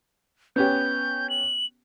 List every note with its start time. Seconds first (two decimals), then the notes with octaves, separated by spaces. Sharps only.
0.56 B3 C#4 G4 G6
1.30 F#7